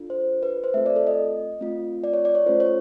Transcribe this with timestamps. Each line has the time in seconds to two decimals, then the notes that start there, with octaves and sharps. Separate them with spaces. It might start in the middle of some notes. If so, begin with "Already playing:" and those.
Already playing: D4 F4 A4
0.10 C5
0.43 B4
0.64 C5
0.74 A3 C4 F4 A4 E5
0.86 D5
0.96 A4
1.07 D#5
1.61 A3 C4 F4
2.04 D5
2.13 C#5
2.25 D5
2.35 C#5
2.46 A3 C#4 F4 A4 C5
2.60 C#5